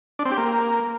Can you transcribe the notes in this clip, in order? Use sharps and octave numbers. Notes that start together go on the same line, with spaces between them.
D4
C4
G4
A#3